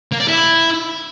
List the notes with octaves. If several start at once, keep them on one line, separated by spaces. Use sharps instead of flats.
A#3
D5
E4